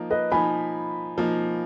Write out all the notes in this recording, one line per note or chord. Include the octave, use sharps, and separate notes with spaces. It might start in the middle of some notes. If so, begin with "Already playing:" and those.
Already playing: F3 A#3 D#4
B4 D#5
F3 A#3 D#4 G#5 B5
F3 A#3 D#4